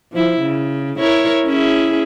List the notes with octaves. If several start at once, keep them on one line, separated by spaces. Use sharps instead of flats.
F3 E4
C#3
E4 A#4 C#5
C#4 E4 G#4